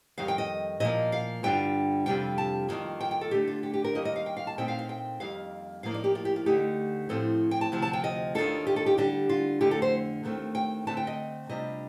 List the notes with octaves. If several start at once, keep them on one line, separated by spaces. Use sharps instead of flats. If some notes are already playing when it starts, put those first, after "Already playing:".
F2 D#3 G3 F5
G5
D#5
A#2 F3 A#3 D#5
F5
G2 D3 G3 D4 F4 G5
F2 C3 G3 D4 F4 G5
A5
F2 C3 D#3 A#3 F4
G5
G5
A4
D3 A3 D4 G4
F4
G4
G4
A#4
D#2 D#3 G3 A#3 D#5
D#5
F5
G5
F5
A5
A#2 A3 C4 D#4 G5
F5
F5
G5
F2 D#3 G3 A#3 F5
A2 F3 A#3 D#4 F5
D5
G4
F4
G4
F4
D2 D3 A3 D#4 G4
A2 F3 C4 A4
G5
A5
D2 C3 F3
A5
G5
D#5
D#2 D#3 A#3 D4 F4 A4
G4
A4
G4
D3 G3 D4 G4
F4
F2 D3 A3 G4
A4
C5
D#2 D#3 A3 C4
G5
D3 A3 C4 A5
G5
D#5
C3 G3 D4 F4 D#5